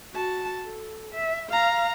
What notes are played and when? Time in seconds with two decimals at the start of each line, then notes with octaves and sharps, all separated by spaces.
0.12 F#4 A5
0.64 A4
1.14 E5
1.50 F5 A#5